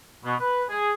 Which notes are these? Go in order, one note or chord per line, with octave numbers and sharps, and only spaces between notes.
B2
B4
G#4